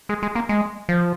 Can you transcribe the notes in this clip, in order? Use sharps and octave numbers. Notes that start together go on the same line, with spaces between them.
G#3
G#3
A#3
G#3
F3